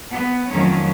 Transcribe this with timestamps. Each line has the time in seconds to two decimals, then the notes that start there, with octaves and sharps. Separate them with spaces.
0.12 B3
0.51 F2 D#3 F3 F#3 A3 C#4